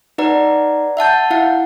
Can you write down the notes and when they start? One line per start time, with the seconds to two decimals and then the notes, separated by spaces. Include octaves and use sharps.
0.18 D#4 B4 D5 F#5 A#5
0.97 E5 F#5 A5 G6
1.30 E4 F5 F#5